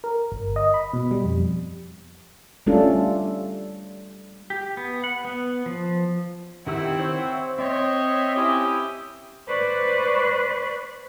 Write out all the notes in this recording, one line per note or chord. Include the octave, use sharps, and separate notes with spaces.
A#4
G1
D#5
B5
B2
G3
F2
G3 A3 C#4 D4 F4 A4
G4
B3
F#5
B3
F3
D#3 C4 E4 G4 F#5 E6
C5 C#5 E6
C4 C#5 D#5 E5 G5 C6
C#4 E4 G4 D#6
B4 C5 D5 C#6 F#6